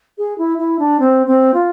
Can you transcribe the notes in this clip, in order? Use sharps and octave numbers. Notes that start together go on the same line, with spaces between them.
G#4
E4
E4
D4
C4
C4
F4